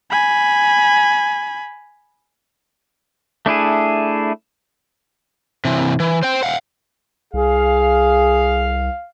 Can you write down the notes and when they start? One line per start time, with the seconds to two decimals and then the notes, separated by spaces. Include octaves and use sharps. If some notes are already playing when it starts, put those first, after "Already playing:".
0.11 G#5 B5
3.46 A3 D4 E4 G#4
5.65 C3 E3
6.00 E3
6.23 C5 G5
6.43 F5 F#5
7.34 C2 G#4 F5